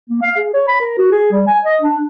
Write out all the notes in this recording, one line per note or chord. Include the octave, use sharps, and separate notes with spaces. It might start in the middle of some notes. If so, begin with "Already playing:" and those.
A#3
F5
G#4
C#5
B5
A#4
F#4
G#4
G3
G#5
D#5
D4